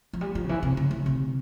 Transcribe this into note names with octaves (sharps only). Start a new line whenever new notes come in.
F3
G3
F3
C#3
E3
C3
C#3
E3
C3